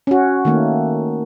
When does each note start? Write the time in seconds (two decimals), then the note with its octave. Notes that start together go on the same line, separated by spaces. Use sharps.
0.07 C#4 F#4
0.45 D#3 A3 A#3